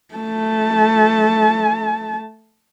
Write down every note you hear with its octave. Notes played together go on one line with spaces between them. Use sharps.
A3 A5